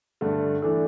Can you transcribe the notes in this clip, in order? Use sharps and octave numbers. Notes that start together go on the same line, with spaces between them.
G2 D3 A3
E3 A3 D4 A4